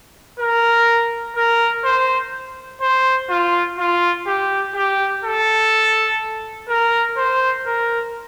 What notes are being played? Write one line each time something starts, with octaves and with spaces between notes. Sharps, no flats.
A#4
A#4
C5
C5
F4
F4
G4
G4
A4
A#4
C5
A#4